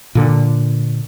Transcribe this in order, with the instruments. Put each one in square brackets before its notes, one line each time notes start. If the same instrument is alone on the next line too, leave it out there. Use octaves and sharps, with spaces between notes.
[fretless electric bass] A#2 D3